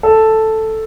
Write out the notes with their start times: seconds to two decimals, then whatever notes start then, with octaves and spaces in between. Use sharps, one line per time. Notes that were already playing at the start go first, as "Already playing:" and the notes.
0.03 A4